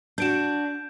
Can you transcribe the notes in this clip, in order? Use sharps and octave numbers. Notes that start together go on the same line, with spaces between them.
D4 F#4 G6 D7 E7